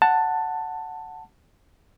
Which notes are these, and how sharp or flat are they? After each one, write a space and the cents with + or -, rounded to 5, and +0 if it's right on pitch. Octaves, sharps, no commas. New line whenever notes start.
F#5 +0 A5 +10